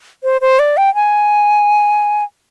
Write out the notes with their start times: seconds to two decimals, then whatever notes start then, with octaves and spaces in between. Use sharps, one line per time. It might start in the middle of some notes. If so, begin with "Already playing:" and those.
0.24 C5
0.41 C5
0.59 D5
0.77 G5
0.95 G#5